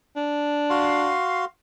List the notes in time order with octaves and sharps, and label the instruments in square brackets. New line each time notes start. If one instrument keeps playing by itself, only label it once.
[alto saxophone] D4
[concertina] F#4 F5 C6